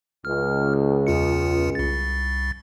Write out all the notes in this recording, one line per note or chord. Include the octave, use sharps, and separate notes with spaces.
C#2 F6
E2 F4 C#7
C2 A6